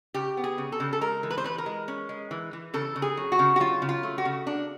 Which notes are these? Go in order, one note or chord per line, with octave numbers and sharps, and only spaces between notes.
C#3 G4
B3
G#4
C#3
A4
C#3
A4
G#3 A#4
E3
B4
C5
E3 B4
A#4
G#3
C#4
G#3
E3
E3
C#3 A4
C#3
G#4
F#3
F#4
C#3
F#4
F#3 F4
C#3
F4
A3
F#4
C#3
D4